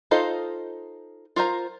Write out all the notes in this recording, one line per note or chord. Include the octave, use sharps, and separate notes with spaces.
D#4 F4 A4 C5 D#5
F4 A#4 C5 A#5